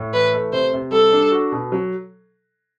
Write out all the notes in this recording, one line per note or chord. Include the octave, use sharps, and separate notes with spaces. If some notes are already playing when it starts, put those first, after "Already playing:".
Already playing: A2
E3 B4
A3
C3 C5
C3
G3 A4
D4
F#4
B2
F#3